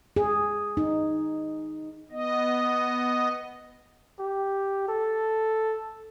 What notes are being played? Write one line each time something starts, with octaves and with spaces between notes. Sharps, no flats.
G#4
D#4
B3 D#5
G4
A4